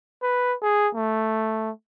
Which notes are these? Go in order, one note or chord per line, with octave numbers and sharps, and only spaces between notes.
B4
G#4
A3